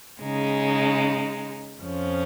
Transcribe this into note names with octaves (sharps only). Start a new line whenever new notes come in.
C#3 G#3 D#4
F2 F3 C#4